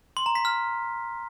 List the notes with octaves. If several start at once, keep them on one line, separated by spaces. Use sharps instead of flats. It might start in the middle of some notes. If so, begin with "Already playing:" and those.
C6
A#5
B6
F6